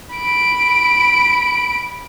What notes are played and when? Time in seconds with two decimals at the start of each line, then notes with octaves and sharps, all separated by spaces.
0.15 B5 D7